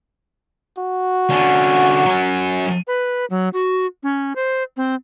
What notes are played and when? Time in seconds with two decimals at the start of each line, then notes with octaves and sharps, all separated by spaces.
0.78 F#4
1.29 D3 C#4
2.06 F#3 C#4
2.87 B4
3.30 F#3
3.53 F#4
4.03 C#4
4.36 C5
4.77 C4